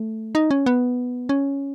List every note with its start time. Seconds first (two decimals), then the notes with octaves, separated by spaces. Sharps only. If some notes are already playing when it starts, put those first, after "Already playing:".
Already playing: A3
0.35 D#4
0.51 C#4
0.66 B3
1.29 C#4